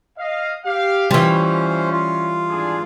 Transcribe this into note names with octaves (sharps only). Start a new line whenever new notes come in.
D#5 F5
G4 F5
E3 G3 C#4 F4 C5
F4
G#1 D4 G#4